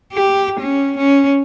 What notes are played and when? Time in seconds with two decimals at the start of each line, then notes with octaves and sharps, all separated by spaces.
0.13 G4
0.60 C#4
0.97 C#4